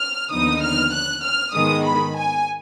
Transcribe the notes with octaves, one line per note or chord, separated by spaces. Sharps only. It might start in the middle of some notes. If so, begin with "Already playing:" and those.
Already playing: F6
D#2 D3 F3 B3 D#4 D#6
F6
F#6
F6
G#2 D#3 G#3 B3 D#6
B5
G#5